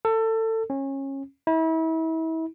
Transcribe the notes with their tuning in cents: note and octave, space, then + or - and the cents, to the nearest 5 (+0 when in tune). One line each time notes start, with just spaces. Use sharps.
A4 +25
C#4 -25
E4 -35